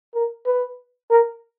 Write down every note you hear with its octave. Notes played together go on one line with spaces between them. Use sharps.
A#4
B4
A#4